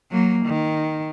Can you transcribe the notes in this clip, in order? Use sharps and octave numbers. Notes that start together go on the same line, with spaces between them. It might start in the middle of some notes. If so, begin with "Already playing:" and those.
F#3 A#3
D#3